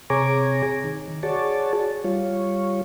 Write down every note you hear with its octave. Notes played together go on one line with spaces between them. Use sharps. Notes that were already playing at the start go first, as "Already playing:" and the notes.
C3 G#4 C#5 G#5 A#5 D6
D#3
F#4 G#4 C#5 D5 A5
G3 F4 C#5